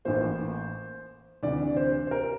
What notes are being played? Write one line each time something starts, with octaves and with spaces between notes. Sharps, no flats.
A1 A2 E3 A#3 C5
D2 C3 E3 D5
C5
C5
A#4